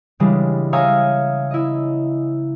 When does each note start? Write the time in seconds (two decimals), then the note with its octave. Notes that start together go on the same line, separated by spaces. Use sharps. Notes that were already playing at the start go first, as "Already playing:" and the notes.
0.20 C#3 E3 G3 G#3 D4
0.73 C#5 E5 F5 G#5 A#5 D#6
1.51 E4 D#5